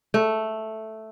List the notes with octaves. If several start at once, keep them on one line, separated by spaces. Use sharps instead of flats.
A3